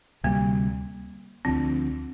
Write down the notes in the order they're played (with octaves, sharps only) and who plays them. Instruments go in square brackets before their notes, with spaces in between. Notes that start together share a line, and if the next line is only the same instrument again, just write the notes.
[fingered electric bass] D2 C3 G3 [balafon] A#3
[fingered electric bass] D2 D3 F3 [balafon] C4